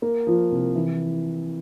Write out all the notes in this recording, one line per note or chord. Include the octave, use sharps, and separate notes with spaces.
A#3
F3
C2
E3